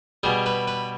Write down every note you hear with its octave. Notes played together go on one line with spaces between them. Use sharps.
B2 G3 G#4
B4
B4